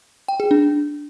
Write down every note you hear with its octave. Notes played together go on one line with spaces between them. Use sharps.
G5
G#4
D4